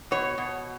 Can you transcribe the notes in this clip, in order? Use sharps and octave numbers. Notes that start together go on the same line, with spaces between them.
B2 C#5
B2